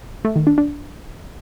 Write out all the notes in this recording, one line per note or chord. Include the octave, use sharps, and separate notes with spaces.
A3
D#3
D4
D4